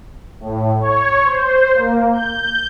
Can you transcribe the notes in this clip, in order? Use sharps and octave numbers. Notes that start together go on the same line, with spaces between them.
A2
C#5
C5
A#3
G6